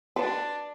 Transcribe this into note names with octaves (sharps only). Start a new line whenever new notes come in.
D4 B4